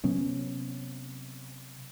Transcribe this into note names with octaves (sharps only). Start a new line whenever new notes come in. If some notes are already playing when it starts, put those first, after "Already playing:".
C3 F#3 B3 C#4